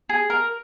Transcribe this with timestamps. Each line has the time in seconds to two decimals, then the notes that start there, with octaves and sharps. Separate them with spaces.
0.09 G#4
0.30 A#4